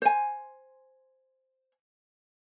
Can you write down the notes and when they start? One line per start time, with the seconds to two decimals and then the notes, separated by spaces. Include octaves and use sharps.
0.02 C5 G#5